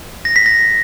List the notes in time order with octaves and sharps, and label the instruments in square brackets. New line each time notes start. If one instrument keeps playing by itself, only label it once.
[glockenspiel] A#6
B6
A#6